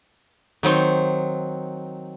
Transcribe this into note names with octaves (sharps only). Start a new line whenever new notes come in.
D#3 F#3 C4